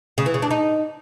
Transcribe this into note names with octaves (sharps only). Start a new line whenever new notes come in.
C#3
E3
C#3
D4
D#4